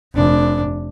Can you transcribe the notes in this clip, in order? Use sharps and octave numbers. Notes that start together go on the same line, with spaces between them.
F1 D4